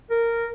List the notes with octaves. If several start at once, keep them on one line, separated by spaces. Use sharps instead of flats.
A#4